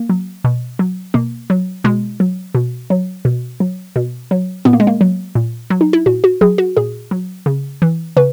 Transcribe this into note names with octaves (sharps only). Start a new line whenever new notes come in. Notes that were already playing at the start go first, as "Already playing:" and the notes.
Already playing: A#3
F#3
B2
F#3
B2 A#3
F#3
B2 G#3
F#3
B2
F#3
B2
F#3
B2
F#3
A#2 B3
A#3
G#3
A#3
F#3
A#2
F#3
D#4
E4
A#2 F#4
F#4
F#3 G#4
F#4
A#2 G#4
F#3
C#3
E3
C#3 B4